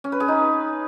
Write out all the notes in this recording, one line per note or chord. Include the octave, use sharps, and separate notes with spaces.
C#4
B4
G#4
D#4